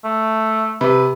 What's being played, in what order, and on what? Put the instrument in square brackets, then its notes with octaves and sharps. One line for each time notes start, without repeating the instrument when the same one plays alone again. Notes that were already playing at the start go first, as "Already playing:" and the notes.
[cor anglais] A3
[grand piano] C3 [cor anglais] B4